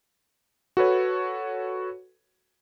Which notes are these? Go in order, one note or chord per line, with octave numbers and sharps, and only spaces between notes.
F#4 A4 B4 C#5